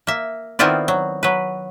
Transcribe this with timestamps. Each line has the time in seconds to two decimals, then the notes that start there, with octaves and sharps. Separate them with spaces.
0.07 A#3 E5
0.59 D#3 B3 C4 E4 F4 D5
0.88 F#3
1.23 F#3 B4